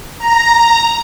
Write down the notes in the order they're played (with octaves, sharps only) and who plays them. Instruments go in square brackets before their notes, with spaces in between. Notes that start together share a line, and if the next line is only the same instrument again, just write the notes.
[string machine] A#5